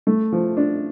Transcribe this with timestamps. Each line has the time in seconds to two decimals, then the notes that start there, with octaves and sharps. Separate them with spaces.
0.07 A3
0.32 F3
0.57 D4